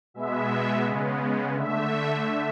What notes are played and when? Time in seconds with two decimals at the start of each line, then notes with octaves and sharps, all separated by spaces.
0.14 B2 G#3 B3 E5
0.84 C#3 G#3 B3
1.54 D3 A3 E5